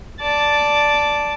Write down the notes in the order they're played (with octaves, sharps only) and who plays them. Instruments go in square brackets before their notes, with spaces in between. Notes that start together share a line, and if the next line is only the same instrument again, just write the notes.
[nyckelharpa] D5 A5